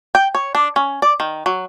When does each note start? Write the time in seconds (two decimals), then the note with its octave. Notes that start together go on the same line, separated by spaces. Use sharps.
0.15 G5
0.35 C#5
0.55 D4
0.76 C#4
1.02 D5
1.20 D#3
1.46 F#3